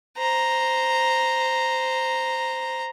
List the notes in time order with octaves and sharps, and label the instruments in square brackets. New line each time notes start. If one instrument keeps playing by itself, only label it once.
[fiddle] C5 A#5